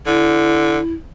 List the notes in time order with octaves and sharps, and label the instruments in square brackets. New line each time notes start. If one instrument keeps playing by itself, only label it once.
[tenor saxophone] D3 [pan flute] E4